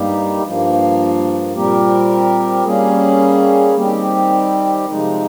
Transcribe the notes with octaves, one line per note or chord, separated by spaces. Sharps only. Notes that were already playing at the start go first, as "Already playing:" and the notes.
Already playing: G2 G3 A#3 D#4 G4
G2 F3 A#3
A#2 G3 C4 G4 A#4
G3 A#3 C#4 G#4
D#3 G3 C4 G4
C3 F3 G#3 D#4